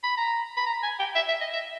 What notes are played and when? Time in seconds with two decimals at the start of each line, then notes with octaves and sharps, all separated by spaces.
0.04 B5
0.17 A#5
0.57 B5
0.67 A#5
0.83 G#5
1.00 G5
1.16 E5
1.28 E5
1.41 D#5
1.53 E5